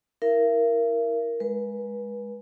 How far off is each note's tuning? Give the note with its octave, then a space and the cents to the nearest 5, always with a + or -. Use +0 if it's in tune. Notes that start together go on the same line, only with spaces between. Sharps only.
E4 -30 A#4 +0 E5 +40
G#3 +0 B4 -30